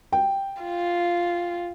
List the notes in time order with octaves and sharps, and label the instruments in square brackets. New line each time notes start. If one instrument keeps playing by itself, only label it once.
[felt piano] G5
[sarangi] F4